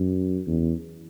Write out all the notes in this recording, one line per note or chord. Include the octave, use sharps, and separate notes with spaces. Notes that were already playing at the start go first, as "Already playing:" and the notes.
Already playing: F#2
E2